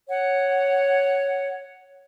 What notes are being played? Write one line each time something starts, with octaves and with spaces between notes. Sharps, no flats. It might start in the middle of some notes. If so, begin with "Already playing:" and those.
C#5 F#5